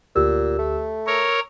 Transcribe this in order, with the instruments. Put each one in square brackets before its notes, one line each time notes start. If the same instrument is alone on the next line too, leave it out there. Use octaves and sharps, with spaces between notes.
[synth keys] D2 G4 E6 [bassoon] A#2
[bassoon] A3
[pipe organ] A#4 C#5 [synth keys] E6